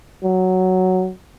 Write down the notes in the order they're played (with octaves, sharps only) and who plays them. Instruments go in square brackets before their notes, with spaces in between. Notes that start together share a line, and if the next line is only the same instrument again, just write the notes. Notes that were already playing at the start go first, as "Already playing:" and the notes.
[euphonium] F#3